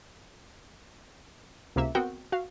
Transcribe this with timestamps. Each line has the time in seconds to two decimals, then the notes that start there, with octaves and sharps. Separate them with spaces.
1.76 C#2 C3 A#3 E5 E7
1.95 B3 C4 F#4 A#4 F#5 G5
2.32 F#4 F5